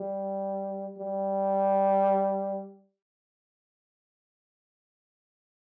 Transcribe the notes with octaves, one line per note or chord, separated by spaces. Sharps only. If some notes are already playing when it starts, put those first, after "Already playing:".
Already playing: G3
G3